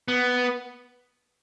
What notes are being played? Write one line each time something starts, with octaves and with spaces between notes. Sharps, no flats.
B3